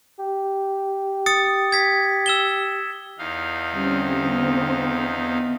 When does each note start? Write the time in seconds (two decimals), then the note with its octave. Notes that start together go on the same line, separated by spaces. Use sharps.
0.19 G4
1.26 D#6 A6 C#7
1.72 G#6 B6
2.26 E6 E7 G7
3.18 E2 D#4 F5
3.72 D3 G3 C4 C#4
4.25 B3